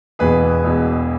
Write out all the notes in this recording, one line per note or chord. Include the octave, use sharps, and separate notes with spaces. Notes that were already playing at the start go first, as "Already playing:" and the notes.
E1 E2 B2 G#4 B4
E1 E2 B2